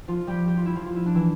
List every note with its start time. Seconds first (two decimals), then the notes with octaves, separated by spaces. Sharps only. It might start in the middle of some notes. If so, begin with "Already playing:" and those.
0.08 F3 F4
0.27 G3 G4
0.48 G4
0.57 F4
0.66 E4
0.75 F3 F4
0.86 F4
0.96 E4
1.06 D4
1.15 E3 E4